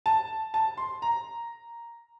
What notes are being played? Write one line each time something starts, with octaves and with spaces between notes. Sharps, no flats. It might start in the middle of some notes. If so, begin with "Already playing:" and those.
A5
A5
C6
A#5